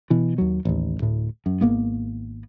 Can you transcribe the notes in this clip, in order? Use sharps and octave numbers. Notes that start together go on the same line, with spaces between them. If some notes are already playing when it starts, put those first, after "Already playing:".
B2 E3
D#2 F#3
A1 D#2
D1 A2
F#2
G#1 A#3 B3